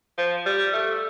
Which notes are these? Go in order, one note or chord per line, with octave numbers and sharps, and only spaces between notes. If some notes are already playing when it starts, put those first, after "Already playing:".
F3
G3
A3